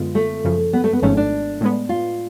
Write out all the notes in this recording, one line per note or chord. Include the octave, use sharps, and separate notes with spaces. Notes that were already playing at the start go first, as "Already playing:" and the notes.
Already playing: F#2 D3 G#3 B3 F4
A3
F#2 C#3 F3
B3
A3
B3
G#1 G#2 F3 A3 C#4
D4
A2 G#3 B3
F4